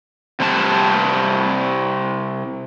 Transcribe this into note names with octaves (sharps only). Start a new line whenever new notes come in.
C3 G3 C4 A5